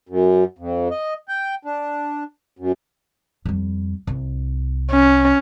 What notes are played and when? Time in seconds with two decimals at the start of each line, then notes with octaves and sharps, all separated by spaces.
0.09 F#2
0.59 F2
0.91 D#5
1.28 G5
1.65 D4
2.59 F#2
3.45 F2 G3
4.07 C2
4.91 C#4